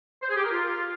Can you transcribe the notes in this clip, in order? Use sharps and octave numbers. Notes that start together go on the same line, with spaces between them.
C5
G#4
G4
A#4
F4